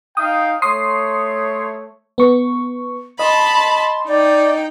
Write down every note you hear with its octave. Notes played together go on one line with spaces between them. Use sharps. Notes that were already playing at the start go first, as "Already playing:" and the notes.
D#4 F5 G5 D#6
A3 C#5 C6 D#6 C7
B3 C#6
D#5 A5 B5 C6
D#4 D5 G5